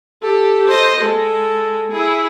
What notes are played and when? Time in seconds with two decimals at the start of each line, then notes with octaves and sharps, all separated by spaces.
0.23 G4 A4
0.68 C5 D#5
1.01 G#3 A4
1.92 E4 G#4